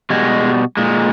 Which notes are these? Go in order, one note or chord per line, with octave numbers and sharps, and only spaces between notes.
B2 G3 G#3
A#2 G#3